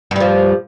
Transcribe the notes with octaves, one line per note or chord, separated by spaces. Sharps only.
G2 F3 G3